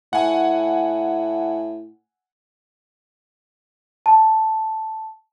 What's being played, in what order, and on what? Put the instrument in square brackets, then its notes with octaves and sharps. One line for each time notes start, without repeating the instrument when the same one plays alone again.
[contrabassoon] A2 [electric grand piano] F#5 G#5
[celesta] A5